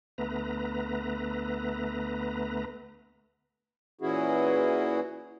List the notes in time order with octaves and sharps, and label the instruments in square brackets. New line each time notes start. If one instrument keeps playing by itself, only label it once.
[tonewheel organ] D2 A3 B3 B4 A#5
[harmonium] A#2 E3 C#4 E4 F#4 G#4